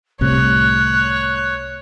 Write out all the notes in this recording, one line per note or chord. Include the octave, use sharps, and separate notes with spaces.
C2 A2 C3 C#5 F#6